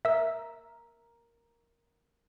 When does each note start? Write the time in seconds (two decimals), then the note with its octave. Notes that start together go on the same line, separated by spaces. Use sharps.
0.05 A#4 E5 E6